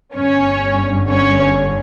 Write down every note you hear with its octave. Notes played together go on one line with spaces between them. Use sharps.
G1 G2 D3 C#4 C#5
C#4 C#5